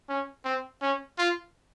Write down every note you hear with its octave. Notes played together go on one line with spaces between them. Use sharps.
C#4
C4
C#4
F4